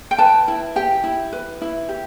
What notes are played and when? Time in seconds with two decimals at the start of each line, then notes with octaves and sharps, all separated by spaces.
0.11 G5
0.18 B4 A5
0.48 E4
0.76 G4 G5
1.04 E4
1.33 B4
1.62 E4
1.89 G4